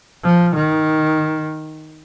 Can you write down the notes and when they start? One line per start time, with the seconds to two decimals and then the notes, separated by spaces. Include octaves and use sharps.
0.24 F3
0.55 D#3